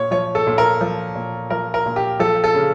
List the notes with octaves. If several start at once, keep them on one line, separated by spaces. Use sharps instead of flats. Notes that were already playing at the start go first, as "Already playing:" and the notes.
Already playing: A#2 C#5
F3 C#5
A4
A#2
A#4
F3
A#2
F3 A#4
A#4
A#2
G4
F3 A4
A4
C#3